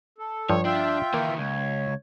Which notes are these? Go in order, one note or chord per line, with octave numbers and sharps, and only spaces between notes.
A4
G2 F3 C#5
D4 F4 E5 G5
D#3 E3 A#3
C#2 C#5